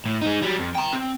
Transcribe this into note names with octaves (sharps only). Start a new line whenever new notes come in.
A2
G#3 D#4
F#3 G3
F2
G5 A#5
C4